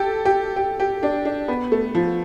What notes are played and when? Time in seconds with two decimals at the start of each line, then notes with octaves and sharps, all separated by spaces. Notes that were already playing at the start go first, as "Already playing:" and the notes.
Already playing: G4 A4
0.25 G4
0.56 G4
0.80 G4
1.03 D4
1.25 D4
1.48 B3
1.72 A3
1.95 F3